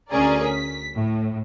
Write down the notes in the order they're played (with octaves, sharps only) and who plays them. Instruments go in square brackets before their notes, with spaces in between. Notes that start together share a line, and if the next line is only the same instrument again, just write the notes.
[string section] D2 C#4 G#4 A#4 D5
B6
A2